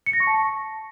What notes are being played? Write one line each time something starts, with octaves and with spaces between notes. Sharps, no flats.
C#7
A#6
C#6
A5
C#6